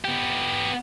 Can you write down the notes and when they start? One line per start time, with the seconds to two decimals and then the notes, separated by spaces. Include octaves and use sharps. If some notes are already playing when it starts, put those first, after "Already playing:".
0.05 B3 G4